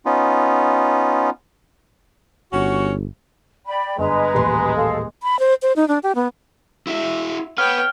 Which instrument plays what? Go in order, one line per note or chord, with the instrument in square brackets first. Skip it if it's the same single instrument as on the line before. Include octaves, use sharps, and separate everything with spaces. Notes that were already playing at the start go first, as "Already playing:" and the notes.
[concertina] B3 C#4 D#4 F4
[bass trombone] G1 [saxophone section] C#4 F#4
[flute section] D5 G5 B5
[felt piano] G1 [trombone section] G#3 [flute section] B4 A#5
[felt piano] D#1 A1 C6
[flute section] A4 F5
[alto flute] B5
C5
C5
D#4
D4
G4
B3
[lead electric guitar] E4 F#4 [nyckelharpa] E5
[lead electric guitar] B4 F#5 [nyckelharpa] C#5 G5 [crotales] F6